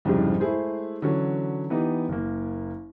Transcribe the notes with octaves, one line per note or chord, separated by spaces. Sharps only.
C2 F2 G#2 C#3 G3 G#3
G#3 A3 E4 G#4 C5
D3 E3 F#3 C#4
E3 B3 D#4 G4
F#1 A#3